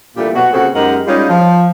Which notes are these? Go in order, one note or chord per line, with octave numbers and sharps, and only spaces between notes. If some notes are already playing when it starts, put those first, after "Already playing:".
A#2 E3 G3 A3 D4 G4
B2 F#3 B3 F#4
A#2 C#3 C4 F#4 G#4 A4
F#2 G#3 D#4 G4 A#4 F#5
G3 G#3 C#4 D#4 F4
F3